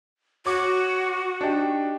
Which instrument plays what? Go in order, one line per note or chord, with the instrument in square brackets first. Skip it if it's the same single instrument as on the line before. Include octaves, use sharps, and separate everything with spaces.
[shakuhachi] F#4 [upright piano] C#5 D6
[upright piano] D4 D#4 G4